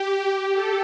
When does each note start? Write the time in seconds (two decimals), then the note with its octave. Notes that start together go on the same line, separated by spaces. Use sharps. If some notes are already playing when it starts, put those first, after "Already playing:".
Already playing: G4
0.14 G4
0.53 A4